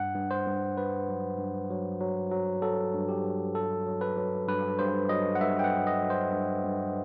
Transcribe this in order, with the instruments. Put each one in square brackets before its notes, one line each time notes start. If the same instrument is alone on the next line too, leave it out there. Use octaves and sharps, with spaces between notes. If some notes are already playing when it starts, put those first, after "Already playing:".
Already playing: [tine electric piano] G2 F#5
G2
C5
G2
G2 B4
F#3
G2
F#3
F#3
F#3
F#3 A4
G2
G4
F#3
G2 A4
F#3
B4
F#3
G2 B4
G2 C5
F#3 D#5
F#5
G2 E5
G5
F#5
G2
D#5
F#3
C5
G2
G2